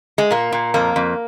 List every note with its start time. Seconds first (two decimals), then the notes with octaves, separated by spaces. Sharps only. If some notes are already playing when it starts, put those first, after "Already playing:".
0.18 G#3
0.31 A#2 A#3
0.52 A#2
0.74 F2 A#3
0.96 F2